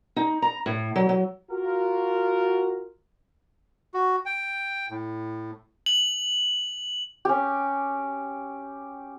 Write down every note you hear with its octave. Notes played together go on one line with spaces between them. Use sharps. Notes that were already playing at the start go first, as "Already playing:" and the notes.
D#4
A#5
A2
F#3
F#3
F4 F#4 A#4
F#4
G5
A2
F#7
C#4 G4